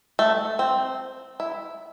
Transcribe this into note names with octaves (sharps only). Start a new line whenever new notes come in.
A3
C4
E4